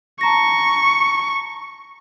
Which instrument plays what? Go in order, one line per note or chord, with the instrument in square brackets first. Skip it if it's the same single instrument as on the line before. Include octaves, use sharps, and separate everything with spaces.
[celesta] A5 A#5 A#6 [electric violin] C#6